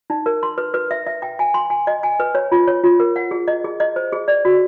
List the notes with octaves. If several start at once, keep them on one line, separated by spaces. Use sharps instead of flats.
D#4
A#4
C6
B4
B4
E5
E5
G5
G#5
C6
G#5
D#5
G#5
B4
C#5
F4
C#5
F4
A#4
F#5
G#4
D#5
G#4
D#5
C5
G#4
D5
F#4